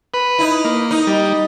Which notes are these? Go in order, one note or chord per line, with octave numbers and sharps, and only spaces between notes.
B4
D#4 E4
A#3
D#4
G3